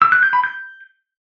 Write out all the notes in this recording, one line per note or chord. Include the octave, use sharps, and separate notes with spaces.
E6
F#6
G6
B5
G6